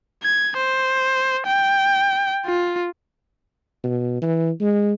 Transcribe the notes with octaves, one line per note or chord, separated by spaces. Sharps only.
G#6
C5
G5
F4
B2
E3
G#3